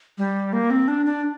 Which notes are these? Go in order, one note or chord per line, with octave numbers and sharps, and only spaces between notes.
G3
A#3
C4
D4
D4